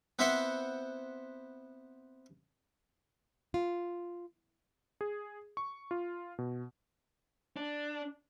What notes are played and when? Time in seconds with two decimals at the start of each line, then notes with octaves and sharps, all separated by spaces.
0.19 B3 C4 E4 C5 E5 F#5
3.54 F4
5.01 G#4
5.57 C#6
5.91 F4
6.38 B2
7.57 D4